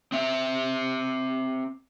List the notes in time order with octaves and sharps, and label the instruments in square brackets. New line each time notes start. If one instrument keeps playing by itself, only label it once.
[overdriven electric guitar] C4 E5